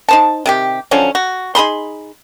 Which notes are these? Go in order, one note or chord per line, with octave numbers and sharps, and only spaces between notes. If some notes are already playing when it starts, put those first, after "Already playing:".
D#4 C5 A5
C3 D#3 G4
D3 F3 F#3 C#4
F#4
D#4 G#4 B5 C6